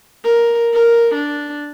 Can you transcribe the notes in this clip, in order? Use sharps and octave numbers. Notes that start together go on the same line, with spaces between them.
A#4
A#4
D4